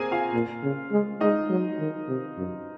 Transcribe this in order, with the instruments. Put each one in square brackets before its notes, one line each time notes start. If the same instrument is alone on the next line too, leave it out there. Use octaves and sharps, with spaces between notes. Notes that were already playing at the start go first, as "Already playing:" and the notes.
Already playing: [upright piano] A#3 C4 G#4 A#4 G#5 A#5
F4 F5
[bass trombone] A#2
C#3
G#3
[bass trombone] G#3 [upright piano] D#4 D#5
[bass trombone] F#3
D#3
C3
F#2